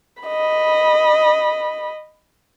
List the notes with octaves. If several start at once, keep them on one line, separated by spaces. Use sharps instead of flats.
D#5 B5